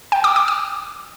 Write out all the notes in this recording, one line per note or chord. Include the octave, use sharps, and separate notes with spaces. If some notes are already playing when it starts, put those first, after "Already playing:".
G5
D6
D6
D#6